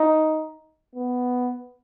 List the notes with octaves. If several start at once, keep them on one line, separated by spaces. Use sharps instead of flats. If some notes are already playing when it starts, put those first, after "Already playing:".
Already playing: D#4
B3